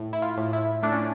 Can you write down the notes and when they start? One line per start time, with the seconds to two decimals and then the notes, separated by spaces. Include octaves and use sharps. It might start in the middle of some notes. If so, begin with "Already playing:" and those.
Already playing: A2
0.13 E4
0.22 F4
0.37 A2
0.53 E4
0.83 A3 D4
0.92 C#4